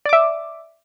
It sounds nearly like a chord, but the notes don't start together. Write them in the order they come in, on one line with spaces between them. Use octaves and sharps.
D5 D6 E5